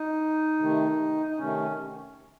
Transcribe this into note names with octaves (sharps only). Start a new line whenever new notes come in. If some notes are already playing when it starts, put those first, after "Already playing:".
Already playing: D#4
C3 D#3 A3
D#4
C3 D#3 A3 C#4